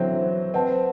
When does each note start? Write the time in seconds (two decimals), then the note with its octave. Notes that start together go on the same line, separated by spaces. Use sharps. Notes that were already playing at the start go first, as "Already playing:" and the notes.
Already playing: D3 E3 F#3 C4 A4 E5
0.54 C4 B4 F#5 A5